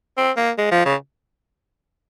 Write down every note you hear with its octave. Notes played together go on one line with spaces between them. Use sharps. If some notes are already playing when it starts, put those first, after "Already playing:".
C4
A#3
G#3
F3
C#3